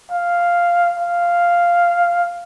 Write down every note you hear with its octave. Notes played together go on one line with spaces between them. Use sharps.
F5
F5